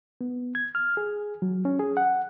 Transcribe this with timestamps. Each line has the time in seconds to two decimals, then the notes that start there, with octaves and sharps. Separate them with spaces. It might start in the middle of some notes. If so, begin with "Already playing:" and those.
0.21 B3
0.55 G#6
0.75 F6
0.97 G#4
1.42 F#3
1.65 C#4
1.79 G#4
1.97 F#5